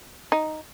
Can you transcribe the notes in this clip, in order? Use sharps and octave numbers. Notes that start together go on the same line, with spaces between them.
D#4